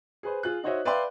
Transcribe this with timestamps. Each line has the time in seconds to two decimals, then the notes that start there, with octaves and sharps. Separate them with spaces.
0.23 G#4 B4 C5
0.43 F4 G#4 F#6
0.63 D#4 F#4 C5 C#5 D#5 E5
0.85 B4 D5 E5 F5 G5 C6